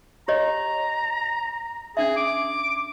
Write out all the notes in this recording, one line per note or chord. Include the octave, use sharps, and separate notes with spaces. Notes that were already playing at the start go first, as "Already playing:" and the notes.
G4 C#5 D#5 A#5
C#4 D4 G#4 E5
D6